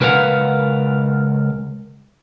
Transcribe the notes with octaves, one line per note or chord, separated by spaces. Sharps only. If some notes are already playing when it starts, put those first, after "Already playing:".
C#2 A#4 B4 C#5 F5 F#5